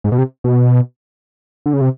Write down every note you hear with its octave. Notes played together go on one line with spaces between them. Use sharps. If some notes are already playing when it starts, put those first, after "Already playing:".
G#2
B2
C3
B2
D3
C#3
C3